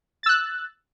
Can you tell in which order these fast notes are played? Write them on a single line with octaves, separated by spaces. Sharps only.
A6 E6 F#6